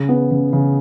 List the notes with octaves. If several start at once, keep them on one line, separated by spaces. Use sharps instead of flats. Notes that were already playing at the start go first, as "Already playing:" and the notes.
Already playing: C#3
B3
C#3
C#3